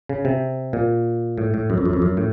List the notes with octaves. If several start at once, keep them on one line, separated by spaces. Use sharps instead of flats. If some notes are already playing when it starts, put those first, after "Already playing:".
C#3
C3
A#2
A2
A2
F#2
F2
F#2
F2
F#2
A2